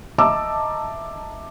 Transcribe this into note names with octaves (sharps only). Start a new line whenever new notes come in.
D#5 E5 A5 A#5 D6 E6